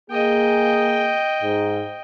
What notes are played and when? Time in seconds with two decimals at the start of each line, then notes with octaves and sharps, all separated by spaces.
0.10 A#3 G#4 D#5 G5
1.43 G#2